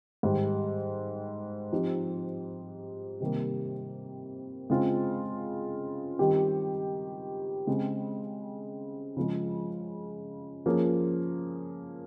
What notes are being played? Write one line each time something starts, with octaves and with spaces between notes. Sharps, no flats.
G#2 D#3 G3
F3 C4 D#4 G4
C3 D#3 G3 A#3
C#3 G#3 C4 F4
D#3 G3 C4 G4
C#3 G#3 C4
C#3 F3 G#3
F3 A#3 C#4 G#4